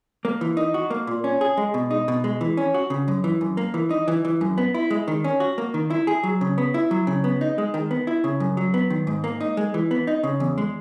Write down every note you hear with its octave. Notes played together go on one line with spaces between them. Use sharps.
A#3
E3
D#4
F#4
A#3
A#2
C#4
G#4
G#3
B2
D#4
B2
G#3
E3
C#4
F#4
C#3
F#2
E3
F#2
A#3
E3
D#4
E3
E3
F#2
B3
E4
G#3
D#3
C#4
F#4
A#3
D#3
E4
G#4
F#3
C#3
B3
E4
F#3
C#3
B3
D#4
G#3
D#3
B3
E4
C#3
F#2
F#3
B3
D#3
G#2
A#3
D#4
G#3
E3
B3
D#4
C#3
E2
G#3